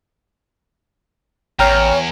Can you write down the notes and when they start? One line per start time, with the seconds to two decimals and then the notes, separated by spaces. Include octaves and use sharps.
1.59 A1 E2 C#5 G5 A#5 F6